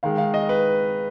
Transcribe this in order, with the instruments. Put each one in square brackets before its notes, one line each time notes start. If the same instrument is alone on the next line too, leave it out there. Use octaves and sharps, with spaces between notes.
[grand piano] D#3 G#3 F5
F5
D#5
B4